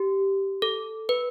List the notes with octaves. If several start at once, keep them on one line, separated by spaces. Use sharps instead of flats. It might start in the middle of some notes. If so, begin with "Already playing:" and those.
Already playing: G4
A4
B4